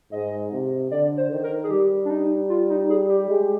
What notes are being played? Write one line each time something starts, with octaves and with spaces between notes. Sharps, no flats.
G#2 D#5
C3
D3 D5
C5
D#3
A#4
G#4
G3 G4
D4
D#4
F4
D#4
G#4
G4
G#3